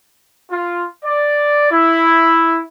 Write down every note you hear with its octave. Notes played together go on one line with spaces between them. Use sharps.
F4
D5
E4